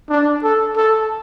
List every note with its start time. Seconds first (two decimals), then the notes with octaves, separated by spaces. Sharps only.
0.10 D4
0.44 A4
0.77 A4